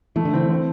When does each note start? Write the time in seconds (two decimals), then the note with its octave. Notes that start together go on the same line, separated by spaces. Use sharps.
0.16 E3 A3
0.25 D3
0.34 E3 C4
0.50 C4